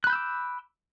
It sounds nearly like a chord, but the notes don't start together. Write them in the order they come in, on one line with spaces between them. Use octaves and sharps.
F#6 B5 G6 E6 D6